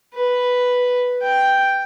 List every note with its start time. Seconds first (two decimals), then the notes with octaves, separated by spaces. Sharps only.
0.14 B4
1.22 G5